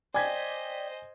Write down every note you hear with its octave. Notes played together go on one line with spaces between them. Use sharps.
C5 D5 D#5 G5 G#5 G#6 B6